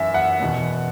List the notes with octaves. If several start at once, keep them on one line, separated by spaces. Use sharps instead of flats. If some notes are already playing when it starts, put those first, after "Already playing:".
Already playing: F#2 E3 E5 G#5
F#5
E2 B2 B3